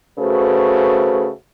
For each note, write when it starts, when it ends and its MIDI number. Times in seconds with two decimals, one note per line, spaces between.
0.18 1.30 49
0.18 1.30 57
0.18 1.30 66
0.18 1.30 71
0.18 1.30 72